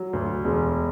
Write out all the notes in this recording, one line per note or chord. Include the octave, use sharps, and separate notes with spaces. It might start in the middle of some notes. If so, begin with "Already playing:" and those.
Already playing: F#3
D2
E1